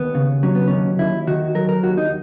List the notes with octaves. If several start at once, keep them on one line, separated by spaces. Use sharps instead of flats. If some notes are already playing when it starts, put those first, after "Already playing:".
Already playing: D#2 B3
C#3
F#3 C#4
B3
D#2 C#4
D#2 E4
D#3 F#4
F#3 A#4
A#4
D#2 F#4
D#4